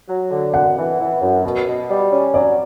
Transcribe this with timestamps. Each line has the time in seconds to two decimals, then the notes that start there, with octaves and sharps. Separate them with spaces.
0.08 F#3
0.31 D3
0.53 F#2 F#5
0.77 E3
0.99 E3
1.21 F#2
1.44 B2
1.67 B2
1.89 G3
2.11 C#4
2.34 F#3 D5